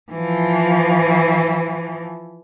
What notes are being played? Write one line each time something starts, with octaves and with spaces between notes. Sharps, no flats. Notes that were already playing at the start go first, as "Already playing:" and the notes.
E3 F3